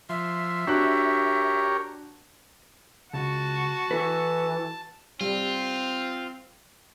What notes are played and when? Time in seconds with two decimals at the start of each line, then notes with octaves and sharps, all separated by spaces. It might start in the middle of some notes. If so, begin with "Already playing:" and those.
0.09 F3 E5 C6
0.67 D4 F#4 G4 A#4 C#5 F#6
3.14 C#2 F#4 A5
3.91 E3 E4 A4 B4
5.21 G3 C4 F4